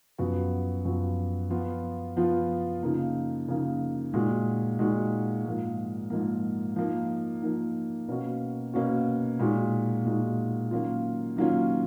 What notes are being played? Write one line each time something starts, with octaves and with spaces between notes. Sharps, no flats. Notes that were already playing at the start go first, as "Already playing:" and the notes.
F#2 F3 B3 F#4
F#2 F3 B3 F#4
F3 B3 F4
F3 B3 F4
C#3 F3 A#3 D#4
C#3 F3 A#3 D#4
A#2 G#3 D#4 F#4
A#2 G#3 D#4 F#4
G#2 F3 A#3
G#2 F3 A#3
F3 A#3 D#4
F3 A#3 D#4
B2 A#3 C#4 F#4
B2 A#3 C#4 F#4
A#2 G#3 D#4 F#4
A#2 G#3 D#4 F#4
D#3 F#3 A#3 C#4 F4
D#3 F#3 A#3 C#4 F4